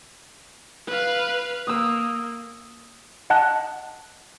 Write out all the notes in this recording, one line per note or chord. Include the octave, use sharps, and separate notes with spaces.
B4 F5
A#3 D#6 E6
D#5 F#5 A5 F#6